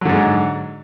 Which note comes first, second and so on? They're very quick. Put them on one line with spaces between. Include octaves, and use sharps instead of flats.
F#3 D3 G#2